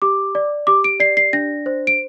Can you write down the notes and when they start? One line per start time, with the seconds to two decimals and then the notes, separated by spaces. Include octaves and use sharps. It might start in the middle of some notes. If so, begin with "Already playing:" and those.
0.02 G4 D6
0.35 D5
0.67 G4 D6
0.84 D7
1.00 D5 C7
1.17 C7
1.33 D4 A#6
1.66 C5
1.87 D7